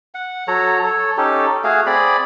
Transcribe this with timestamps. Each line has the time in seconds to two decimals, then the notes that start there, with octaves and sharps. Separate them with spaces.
0.15 F#5
0.48 F#3 A4 C#5 A#5
0.84 A4 C#5
1.18 C#4 D#4 G4 A4
1.64 A3 F#4 G#4 F5
1.86 C4 G#4 D5 B5